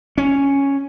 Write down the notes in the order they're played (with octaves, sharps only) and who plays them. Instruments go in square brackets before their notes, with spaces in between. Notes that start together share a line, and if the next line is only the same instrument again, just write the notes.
[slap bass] C#4